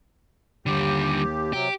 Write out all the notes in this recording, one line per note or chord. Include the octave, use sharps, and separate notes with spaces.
D#2 D3 G3 G4
C3 F#3 G4